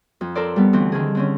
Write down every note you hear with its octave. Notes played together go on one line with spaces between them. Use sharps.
F2
A4 A#4 C5 D5
G3 B3
D2 E3 C4
D3 D#3 G#4
D3 C4 C#4